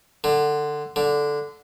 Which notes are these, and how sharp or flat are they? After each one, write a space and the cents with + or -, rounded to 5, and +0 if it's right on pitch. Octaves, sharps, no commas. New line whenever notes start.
D3 +20
D3 -5